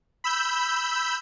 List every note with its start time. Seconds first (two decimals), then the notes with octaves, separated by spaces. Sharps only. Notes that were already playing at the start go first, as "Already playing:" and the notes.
0.24 B5 E6 G6